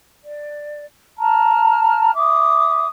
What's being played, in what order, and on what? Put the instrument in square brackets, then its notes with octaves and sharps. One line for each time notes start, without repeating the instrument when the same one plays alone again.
[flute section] D5
A5 A#5 F6
E5 D6 D#6